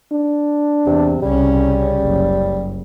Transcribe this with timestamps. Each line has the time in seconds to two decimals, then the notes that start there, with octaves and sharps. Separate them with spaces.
0.12 D4
0.86 E2 C3
1.22 C2 C#3 G3 C#4
2.01 F#1